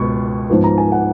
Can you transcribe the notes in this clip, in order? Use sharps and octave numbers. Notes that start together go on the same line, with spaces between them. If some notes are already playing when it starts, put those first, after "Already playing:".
Already playing: C#2 B2 C#6
G#2 F3 B3
A#5
G#5
F#5